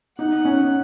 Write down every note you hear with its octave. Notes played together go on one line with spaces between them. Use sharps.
D#4 F#5
C#4